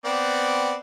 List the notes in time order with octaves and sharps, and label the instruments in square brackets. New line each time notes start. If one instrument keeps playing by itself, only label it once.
[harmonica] B3 C4 D5